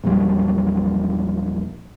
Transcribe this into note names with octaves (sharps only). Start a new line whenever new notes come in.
A#1 E2 F#3 G3